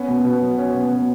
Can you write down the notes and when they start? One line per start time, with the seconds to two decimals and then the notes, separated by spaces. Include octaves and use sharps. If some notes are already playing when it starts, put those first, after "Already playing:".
Already playing: B3 C#4
0.08 B2
0.25 B2
0.41 F#3
0.58 C#4
0.74 B2
0.91 B2